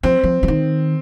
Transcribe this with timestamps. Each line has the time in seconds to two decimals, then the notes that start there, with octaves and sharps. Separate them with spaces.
0.03 F3 C4
0.24 F3
0.43 F3
0.48 D#3